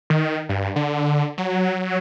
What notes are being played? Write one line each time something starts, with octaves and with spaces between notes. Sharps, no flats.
D#3
G2
D3
F#3